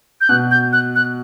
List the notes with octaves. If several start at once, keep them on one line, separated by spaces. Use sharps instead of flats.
G6
B2 F#6
G6
F#6
F#6